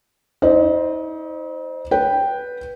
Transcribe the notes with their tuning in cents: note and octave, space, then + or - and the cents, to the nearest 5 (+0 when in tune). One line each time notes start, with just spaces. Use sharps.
D#4 +45 C5 +0 D#5 -40
B4 -10 G5 +0